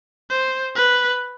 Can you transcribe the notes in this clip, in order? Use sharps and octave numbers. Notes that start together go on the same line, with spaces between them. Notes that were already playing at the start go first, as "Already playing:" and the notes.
C5
B4